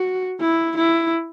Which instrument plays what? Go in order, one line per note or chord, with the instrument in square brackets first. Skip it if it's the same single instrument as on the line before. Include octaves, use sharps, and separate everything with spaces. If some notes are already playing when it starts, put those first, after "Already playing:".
Already playing: [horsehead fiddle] F#4
E4
E4